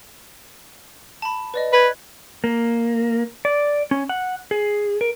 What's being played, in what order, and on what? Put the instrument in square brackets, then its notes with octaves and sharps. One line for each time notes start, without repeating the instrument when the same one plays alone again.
[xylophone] A5 B5
B4 D5 D#5
[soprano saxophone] B4 [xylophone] F#6 G#6
[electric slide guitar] A#3
D5
C#4
F#5
G#4
A#4